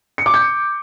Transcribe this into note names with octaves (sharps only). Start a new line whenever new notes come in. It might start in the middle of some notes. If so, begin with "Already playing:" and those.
C#7
D6
G6